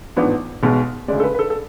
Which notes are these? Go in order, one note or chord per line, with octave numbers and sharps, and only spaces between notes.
A1 G#2 F3 B3 D4
B1 B2 G#3
D2 C#3 G#3 D5
A4
B4
B4
A4
A4